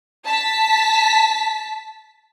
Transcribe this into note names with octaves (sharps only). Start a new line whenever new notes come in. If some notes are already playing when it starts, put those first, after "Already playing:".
A5 B6